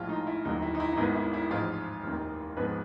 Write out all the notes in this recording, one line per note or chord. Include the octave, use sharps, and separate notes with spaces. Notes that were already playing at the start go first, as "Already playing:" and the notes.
Already playing: A#1 A2 F3 G#3 F4
D#4
E4
F1 D#2 D3 F#3 D#4
E4
D#4
E4
D#4
G#1 G#2 D#3 G#3 B3 E4
E4
E4
A1 G#2 F3 G#3 F4
F1 D#2 D#3
G#1 G#2 F3 G#3 B3 B4